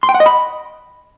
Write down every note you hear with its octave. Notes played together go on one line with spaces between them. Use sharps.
C6
G5
F#5
D#5
B5